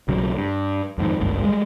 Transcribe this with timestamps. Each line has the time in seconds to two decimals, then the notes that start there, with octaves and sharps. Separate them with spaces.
0.08 B1 C#3 F#3
0.37 G2
0.98 F2 G#2 D#3
1.20 G#1 C#2 G2
1.44 G3 G#3